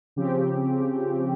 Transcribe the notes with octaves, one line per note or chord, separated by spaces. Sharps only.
C#3 F3 C4 G4